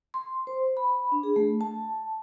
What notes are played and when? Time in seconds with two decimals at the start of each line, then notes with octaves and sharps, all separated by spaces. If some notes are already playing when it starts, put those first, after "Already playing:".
0.14 C6
0.47 C5
0.77 B5
1.12 D4
1.23 G#4
1.36 A3
1.61 A5